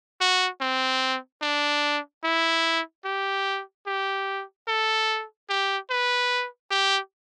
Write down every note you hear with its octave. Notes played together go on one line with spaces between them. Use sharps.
F#4
C4
D4
E4
G4
G4
A4
G4
B4
G4